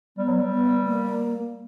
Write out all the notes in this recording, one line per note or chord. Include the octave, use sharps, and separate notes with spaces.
G3 B3
F#3
G3
B3
A#3